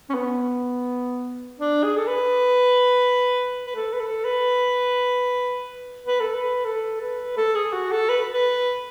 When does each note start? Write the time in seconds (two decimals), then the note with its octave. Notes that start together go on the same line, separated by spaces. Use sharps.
0.10 C#4
0.14 B3
1.59 D4
1.84 G#4
1.97 A4
2.07 B4
3.67 B4
3.76 A4
3.93 B4
4.00 A4
4.24 B4
6.06 B4
6.20 A4
6.34 B4
6.65 A4
7.01 B4
7.37 A4
7.55 G#4
7.73 F#4
7.92 A4
8.09 B4
8.32 B4